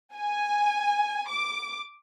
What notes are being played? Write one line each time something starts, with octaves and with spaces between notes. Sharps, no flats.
G#5
D6